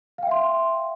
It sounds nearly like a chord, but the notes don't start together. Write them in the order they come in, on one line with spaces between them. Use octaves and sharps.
F5 G5 E5 C6